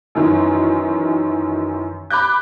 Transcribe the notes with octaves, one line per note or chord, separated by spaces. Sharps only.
F#2 D#3 E3
B5 D6 F#6 G6